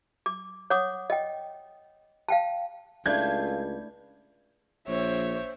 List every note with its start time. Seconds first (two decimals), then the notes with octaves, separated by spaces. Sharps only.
0.26 D6
0.70 C#5 F#5 D6 D#6
1.10 D#5 G5
2.29 F5 G5 A5
3.06 C#2 A3 D4 E4 F5 G6 G#6
4.88 A#1 C5 C#5 E5